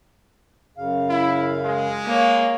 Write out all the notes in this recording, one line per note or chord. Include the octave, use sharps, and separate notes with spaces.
F#2 C#3 F5
E4
G#3
A#3 C#5